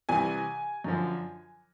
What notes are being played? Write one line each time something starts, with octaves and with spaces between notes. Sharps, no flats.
C2 C3 E3 G#5
F#2 D3 F3